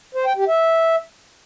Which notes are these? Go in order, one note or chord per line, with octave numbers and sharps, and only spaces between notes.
C5
G5
G4
E5